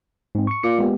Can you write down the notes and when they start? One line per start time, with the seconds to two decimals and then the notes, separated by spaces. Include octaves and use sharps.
0.35 G#2 C4
0.47 C#6 C#7
0.63 A#2 D6 C#7
0.78 G#3 B3 G4